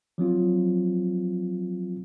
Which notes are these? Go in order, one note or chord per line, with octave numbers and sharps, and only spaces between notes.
F3 F#3 C4 F4